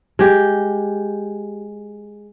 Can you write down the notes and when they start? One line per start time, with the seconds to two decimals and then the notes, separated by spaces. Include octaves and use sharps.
0.19 G#3 G4